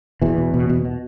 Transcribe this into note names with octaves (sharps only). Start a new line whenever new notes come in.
E2 B2 E3
B2
B2
B2
B2